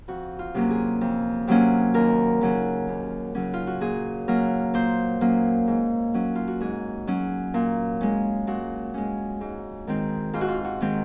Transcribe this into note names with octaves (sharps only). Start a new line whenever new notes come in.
F2 F#4
F4
C3 F#3 A#3 C#4
G#4
F2
C3 F#3 A#3 C#4
D#2 A#4
C#3 F#3 C#4
D#2
C#3 F#3 C#4
F4
F#4
A#2 G#4
F#3 A#3 C#4 A#4
A#2 C5
F#3 A#3 C#4
G#2
F#3 C#4
F4
F#4
G#2 G#4
F#3 C#4
A#2
G#3 C#4
A#2 F#4
G#3 C#4
G#2
D#3 G#3 C4
G#2 F4
F#4
F4
F#4
D#3 G#3 C4